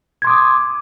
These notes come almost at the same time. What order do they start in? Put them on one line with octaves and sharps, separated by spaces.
G#6 C6 D6 D#6